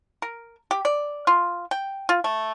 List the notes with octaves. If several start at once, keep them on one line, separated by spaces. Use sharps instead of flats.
A#4
G4
D5
F4
G5
F4
A3